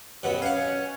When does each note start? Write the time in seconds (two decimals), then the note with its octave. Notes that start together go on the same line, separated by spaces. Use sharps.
0.23 F#2 B2 B3 G4 F#5
0.42 C#4 F5 F#5